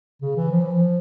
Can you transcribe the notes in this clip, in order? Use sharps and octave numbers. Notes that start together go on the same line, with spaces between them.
C#3
E3
F3
E3
F3